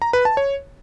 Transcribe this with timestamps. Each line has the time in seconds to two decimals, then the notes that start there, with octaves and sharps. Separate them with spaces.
0.02 A#5
0.13 B4
0.25 A5
0.37 C#5